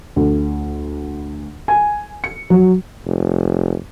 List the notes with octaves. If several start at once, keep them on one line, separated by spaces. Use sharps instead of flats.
D2
G#5
C#7
F#3
F1